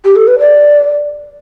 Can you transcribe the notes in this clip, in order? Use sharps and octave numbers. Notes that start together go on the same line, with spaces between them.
G4
A4
B4
D5